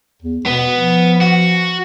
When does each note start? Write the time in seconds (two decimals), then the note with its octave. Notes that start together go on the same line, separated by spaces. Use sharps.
0.22 E2
0.46 B2 B3
0.75 F3
1.21 F#4